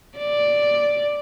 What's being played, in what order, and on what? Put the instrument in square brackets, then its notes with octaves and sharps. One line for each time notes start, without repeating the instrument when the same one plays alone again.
[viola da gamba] D5